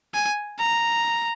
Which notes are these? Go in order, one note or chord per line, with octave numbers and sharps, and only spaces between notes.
G#5
A#5